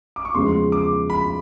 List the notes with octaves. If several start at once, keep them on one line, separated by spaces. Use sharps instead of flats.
D6
C#6
E2 C#3 F3 G#3 C6
D6
B5